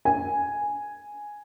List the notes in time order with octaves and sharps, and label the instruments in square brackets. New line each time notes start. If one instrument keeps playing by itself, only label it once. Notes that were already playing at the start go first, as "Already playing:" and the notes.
[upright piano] G#5